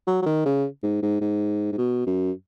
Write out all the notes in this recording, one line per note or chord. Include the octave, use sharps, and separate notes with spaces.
F#3
F#3
D#3
C#3
G#2
G#2
G#2
G#2
B2
F#2